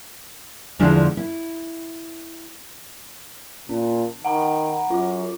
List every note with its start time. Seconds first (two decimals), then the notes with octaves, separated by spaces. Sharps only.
0.79 E2 D3 F3 G#3 D4 E4
1.17 E4
3.69 A#2 C#4
4.25 D#3 F#5 A#5 B5
4.90 F#2 F4 D6